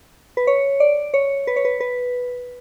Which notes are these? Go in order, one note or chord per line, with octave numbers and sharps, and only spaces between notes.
B4
C#5
D5
C#5
B4
C#5
B4
B4